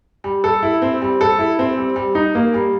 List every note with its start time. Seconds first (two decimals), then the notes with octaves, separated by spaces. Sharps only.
0.24 G3
0.44 A4
0.63 E4
0.82 C4
1.02 G3
1.21 A4
1.39 E4
1.59 C4
1.77 G3
1.96 G3
2.15 D#4
2.35 A#3
2.54 G3